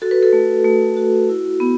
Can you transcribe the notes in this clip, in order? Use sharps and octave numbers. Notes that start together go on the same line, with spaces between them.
F#4 A4
B4
A4
A3
A3
F#4
E4
B3